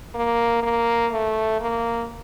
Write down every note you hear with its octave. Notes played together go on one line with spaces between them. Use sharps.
A#3
A#3
A3
A#3